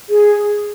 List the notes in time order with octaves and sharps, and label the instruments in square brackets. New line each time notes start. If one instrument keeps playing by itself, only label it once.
[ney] G#4